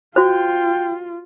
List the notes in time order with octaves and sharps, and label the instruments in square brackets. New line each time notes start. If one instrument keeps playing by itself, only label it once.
[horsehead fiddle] F4 [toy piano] F#4 C5 [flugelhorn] G5